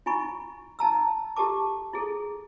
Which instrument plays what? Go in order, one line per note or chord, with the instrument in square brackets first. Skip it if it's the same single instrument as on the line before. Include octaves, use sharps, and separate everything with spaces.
[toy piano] D#4 E4 G#5 B5 C#6
D#4 A5 A#5 E6
E4 G4 A4 A#4 A5 D6
E4 G#4 A4